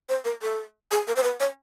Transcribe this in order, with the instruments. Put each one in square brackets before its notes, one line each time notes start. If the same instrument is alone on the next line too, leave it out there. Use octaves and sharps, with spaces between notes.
[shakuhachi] C5
A#4
A4
G#4
A#4
C5
B4
C#5